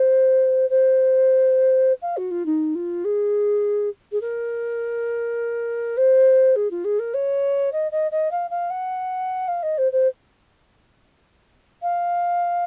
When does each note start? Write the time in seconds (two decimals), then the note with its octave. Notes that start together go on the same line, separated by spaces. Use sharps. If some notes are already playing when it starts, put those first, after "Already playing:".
Already playing: C5
0.69 C5
2.01 F5
2.17 F#4
2.31 F4
2.45 D#4
2.75 F4
3.04 G#4
4.12 G#4
4.21 A#4
5.97 C5
6.55 G#4
6.70 F4
6.84 G#4
6.99 A#4
7.14 C#5
7.72 D#5
7.91 D#5
8.11 D#5
8.31 F5
8.50 F5
8.70 F#5
9.48 F5
9.62 D#5
9.77 C5
9.92 C5
11.82 F5